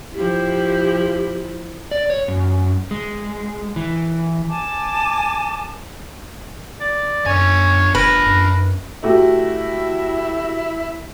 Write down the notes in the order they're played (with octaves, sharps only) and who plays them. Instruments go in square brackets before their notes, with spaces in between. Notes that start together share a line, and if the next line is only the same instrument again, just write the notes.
[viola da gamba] F3 E4 [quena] G4
[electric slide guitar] D5
C#5
F#2
G#3
E3
[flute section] G#5 A5 D6
[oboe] D5
[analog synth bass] F#2 [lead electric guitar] D4 G#5 [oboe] C#5
[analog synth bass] F1 [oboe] A#4 [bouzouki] B4
[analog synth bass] F#2
[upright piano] A3 F#4 G4 [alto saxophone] E4